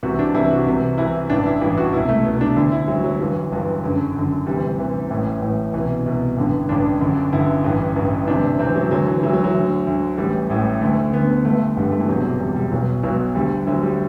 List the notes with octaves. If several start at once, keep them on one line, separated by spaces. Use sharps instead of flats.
C2 C3 E3 F#4
D4
C2 C3 E3 E4
F#4
C2 C3 E3
C2 C3 E3 E4
A1 G2 E3 D4
E4
A1 G2 E3 E4
F#4
C2 B2 E4
A3
C2 B2 B3
D4
D2 D3 E4
E4
D2 D3 F#3
F#3
G1 G2 E3 F#3
G1 G2 E3
F#1 F#2 D3
F#1 F#2 D3
D2 C3 E3 G3
D2 C3 E3
A1 A2 E3
A1 A2 E3
C2 B2 E3
C2 B2
A1 G2 D3
A1 G2 D3 D4
G1 F#2 D3
G1 F#2 D3 E4
A1 G2 E3
A1 G2 E3
D2 C3 E3 D4
D2 C3 E3 C4
F#3
D2 D3 F#3
E3
D2 D3 F#3
F#3
F#3
D2 D3
D2 D3
A1 A2 E3 G3
A1 A2 E3
D2 D3 A3
A3
D2 D3 B3
G1 G2 D3 A3
G1 G2 D3 G3
A3
E3
E1 E2 C3 F#3
E1 E2 C3 G3
G3
B1 B2 F#3
B1 B2 F#3
D2 D3 G3
D2 D3 F#3
G3